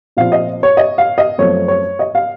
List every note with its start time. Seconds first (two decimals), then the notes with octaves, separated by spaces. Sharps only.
0.17 A#2 F3 C4 F4 F5
0.32 D#5
0.63 C#5
0.77 D#5
0.98 F5
1.18 D#5
1.38 F#2 F3 A3 C4 C#5
1.68 C#5
1.99 D#5
2.15 F5